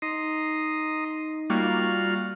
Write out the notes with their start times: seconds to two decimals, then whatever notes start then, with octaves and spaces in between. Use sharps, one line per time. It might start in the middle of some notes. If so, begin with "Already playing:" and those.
0.02 D#4 A#5 C6 D#6
1.50 G3 A#3 F4 F#4 F5 C#6